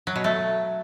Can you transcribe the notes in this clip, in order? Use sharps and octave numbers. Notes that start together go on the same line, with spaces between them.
F#3
B2
A3